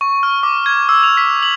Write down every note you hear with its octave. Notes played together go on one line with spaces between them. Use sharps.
C#6
F6
D6
G#6
E6
F7
B6
F#7